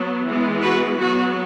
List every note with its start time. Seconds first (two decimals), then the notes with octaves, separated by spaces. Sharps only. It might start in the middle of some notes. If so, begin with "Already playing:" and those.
Already playing: F#3 B3
0.27 E3 G#3 B3
0.62 F#4 B4
0.99 F#3 B3 F#4